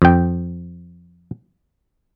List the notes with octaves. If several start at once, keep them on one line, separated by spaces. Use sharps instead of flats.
F2 G5